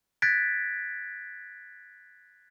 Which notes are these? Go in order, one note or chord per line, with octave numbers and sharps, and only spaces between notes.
F#6 G#6 A6 B6 D7